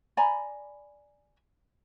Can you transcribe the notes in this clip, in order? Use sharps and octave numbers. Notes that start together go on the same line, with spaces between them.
D5 G#5 A#5 B5